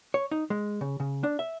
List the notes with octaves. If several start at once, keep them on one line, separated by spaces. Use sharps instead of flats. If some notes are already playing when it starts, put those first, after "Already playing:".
C#5
D#4
G#3
C#3
C#3
D4
E5